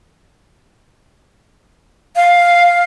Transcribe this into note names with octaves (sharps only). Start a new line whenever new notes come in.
F5